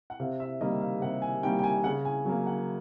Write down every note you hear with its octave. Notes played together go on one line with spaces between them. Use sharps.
F#5
C3 F5
E5
D#3 G3 A#3 D#5
F5
C3 F#5
G#5
D#3 G3 A#3 G5
G5
G#5
C#3 F#5
G#5
F#3 A#3
F#5